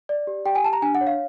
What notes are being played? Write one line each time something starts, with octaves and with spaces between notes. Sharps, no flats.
D5
G4
G4 G5
G#5
G4 A5
A#5
D4 G#5
F#5
C#5
F5